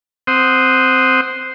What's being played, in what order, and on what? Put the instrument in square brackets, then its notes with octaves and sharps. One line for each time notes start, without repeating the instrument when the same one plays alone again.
[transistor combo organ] C4 C5 F#5 D#6